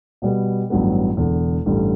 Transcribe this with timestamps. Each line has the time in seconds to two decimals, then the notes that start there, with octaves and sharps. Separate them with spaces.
0.22 B2 G3 B3
0.70 A1 G2 F#3 B3
1.17 E1 E2 D3
1.66 A1 G2 D3 G3